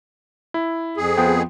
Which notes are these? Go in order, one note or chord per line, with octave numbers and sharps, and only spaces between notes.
E4
F2 G#4
F3 B3 G5